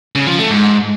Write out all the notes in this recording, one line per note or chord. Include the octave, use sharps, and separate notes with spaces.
C#3
F3
A3
G#2